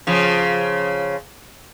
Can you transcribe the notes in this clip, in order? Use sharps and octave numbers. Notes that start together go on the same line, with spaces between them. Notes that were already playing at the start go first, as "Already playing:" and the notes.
C#3 F3